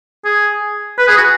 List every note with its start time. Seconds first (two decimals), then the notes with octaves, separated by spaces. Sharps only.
0.25 G#4
0.99 B4
1.08 G#4
1.17 F#4